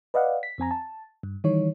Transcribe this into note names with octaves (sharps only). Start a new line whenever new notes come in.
B4 D5 D#5 F5 F#5
B6
F2 C4 G#5 A#5
A5
G2
D#3 E3 G3 D#4 C#5